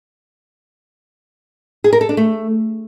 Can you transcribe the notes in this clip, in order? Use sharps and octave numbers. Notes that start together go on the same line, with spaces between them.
G#4
A#4
A4
D4
A3